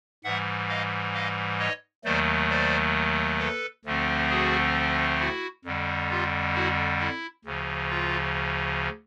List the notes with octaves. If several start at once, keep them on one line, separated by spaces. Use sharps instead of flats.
G#2 E3 G3 E5 F#5
D#5 F5
D#5 F5
C#5 D#5
D#2 D#3 F#3 A3 C5 D5
C5 D5
A4 B4
D2 D3 F3 A3 C4
F#4 G#4
E4 F#4
F2 D3 G3
F4 G4
E4 F#4
E4
D2 C#3 F3
F4